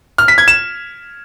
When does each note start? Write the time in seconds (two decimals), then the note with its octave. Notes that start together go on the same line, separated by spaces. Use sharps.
0.18 F6
0.28 B6
0.38 G#6
0.48 E7